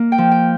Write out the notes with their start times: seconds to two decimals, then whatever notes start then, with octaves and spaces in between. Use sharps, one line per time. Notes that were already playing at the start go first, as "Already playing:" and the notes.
Already playing: A#3
0.12 G5
0.18 F3
0.31 G5